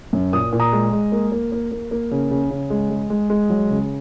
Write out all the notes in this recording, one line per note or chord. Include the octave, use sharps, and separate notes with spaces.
F#2
A#2 D#6
A#2
A#5 D#6
G#3
G#3
A#3
A#3
A#3
A#3
A#3
C#3
C#3
C#3
G#3
G#3
G#3
G#3
F#3
C#3